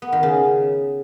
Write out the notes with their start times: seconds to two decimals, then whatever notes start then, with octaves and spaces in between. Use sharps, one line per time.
0.02 B3
0.12 D#3
0.23 C#3